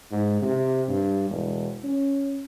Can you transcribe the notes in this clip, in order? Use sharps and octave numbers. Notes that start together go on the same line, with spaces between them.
G#2
C3
G2
E1
C#4